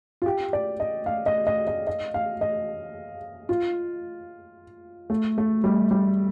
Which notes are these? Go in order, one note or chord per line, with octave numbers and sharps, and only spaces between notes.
F4
G4
D5
D#5
F5
D#5
D#5
D#5
D#5
F5
D#5
F4
A3
A3
G3
G3